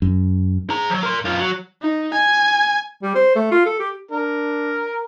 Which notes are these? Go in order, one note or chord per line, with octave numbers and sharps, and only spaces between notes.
F#2
G#4 A#5
F3 F#3
A#4 C6
F#2 F4
F#3
D#4
G#5
G3
C5
A3
F4
A4
G4
D4 A#4